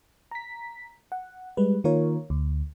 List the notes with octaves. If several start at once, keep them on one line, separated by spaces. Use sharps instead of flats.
A#5 B6
F#5
G3 G#3 B4
D#3 A#3 F4 A#4 C#5
D2